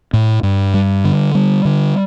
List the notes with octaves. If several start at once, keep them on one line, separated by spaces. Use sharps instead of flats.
A2
G2
G3
D3
G3
D3